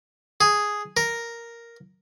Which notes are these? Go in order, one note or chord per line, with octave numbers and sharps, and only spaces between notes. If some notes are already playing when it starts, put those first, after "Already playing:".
G#4
A#4